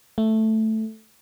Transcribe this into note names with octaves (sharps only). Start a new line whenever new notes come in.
A3